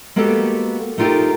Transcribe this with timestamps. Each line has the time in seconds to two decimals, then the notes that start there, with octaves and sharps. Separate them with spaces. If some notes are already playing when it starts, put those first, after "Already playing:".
0.16 G#3 A#3 B3 F#4 G4 A4
0.98 A3 D#4 F4 G4 A4 A#4